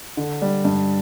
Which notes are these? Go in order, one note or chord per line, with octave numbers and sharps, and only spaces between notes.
D3
G3
G2